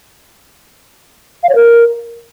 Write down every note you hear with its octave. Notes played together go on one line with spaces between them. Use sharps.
F5
C#5
A#4